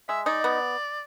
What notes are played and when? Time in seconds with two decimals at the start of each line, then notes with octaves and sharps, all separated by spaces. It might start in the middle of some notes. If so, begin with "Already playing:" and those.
0.08 G#3 E5
0.26 D#4 D5
0.44 B3